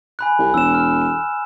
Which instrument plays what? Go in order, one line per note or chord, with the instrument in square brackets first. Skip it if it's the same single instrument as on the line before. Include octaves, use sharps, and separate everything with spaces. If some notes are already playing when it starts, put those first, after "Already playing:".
[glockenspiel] G#5 B5 F#6
[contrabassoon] C2
[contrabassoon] E1 [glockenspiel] E6 E7
[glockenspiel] F6
E7